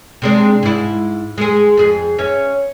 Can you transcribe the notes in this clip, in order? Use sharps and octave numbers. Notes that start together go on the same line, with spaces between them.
C3 G#3 D4
G#2 E4
G#3 G#4
F2 G#4
C#4 C#5 E5